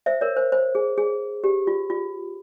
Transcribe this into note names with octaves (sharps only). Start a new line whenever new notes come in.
C5 E5
A#4 C#5
C5
C5
G#4
G#4
G4
F4
F4